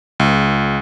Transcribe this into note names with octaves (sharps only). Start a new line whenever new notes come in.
C#2